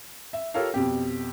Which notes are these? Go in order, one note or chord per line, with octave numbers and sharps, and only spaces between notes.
E5
F4 G4 A4 A#4 C#5 F5
F2 B2 G4